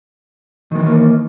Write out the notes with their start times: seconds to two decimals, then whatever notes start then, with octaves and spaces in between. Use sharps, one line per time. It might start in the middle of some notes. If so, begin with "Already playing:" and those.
0.71 D#3
0.75 G#3
0.79 E3
0.83 G3
0.86 A#3